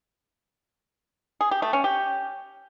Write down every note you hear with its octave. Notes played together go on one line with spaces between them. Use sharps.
G#4
G4
A3
C#4
G4